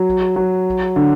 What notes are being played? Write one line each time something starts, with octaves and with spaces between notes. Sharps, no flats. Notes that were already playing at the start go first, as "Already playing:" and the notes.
Already playing: F#3
F#3
D3